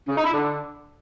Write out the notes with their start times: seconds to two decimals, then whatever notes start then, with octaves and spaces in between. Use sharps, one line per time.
0.09 C#3
0.16 D#4
0.24 E4
0.32 D3